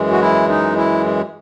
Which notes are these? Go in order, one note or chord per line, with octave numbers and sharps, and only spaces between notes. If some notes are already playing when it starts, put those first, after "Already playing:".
Already playing: F#2 E3 G#3
F#4
E4
D#4
E4